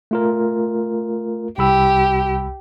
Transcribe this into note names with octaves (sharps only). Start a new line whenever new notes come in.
A3 F4 A#4
C2 G4 B5 E6